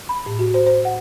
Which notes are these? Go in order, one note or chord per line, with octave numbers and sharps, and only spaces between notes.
B5
A2
F#4
C5
C5
F#5